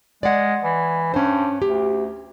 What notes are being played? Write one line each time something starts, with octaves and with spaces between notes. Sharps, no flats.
G#3 D5 F#5
E3
G2 C#4 C5
D2 G4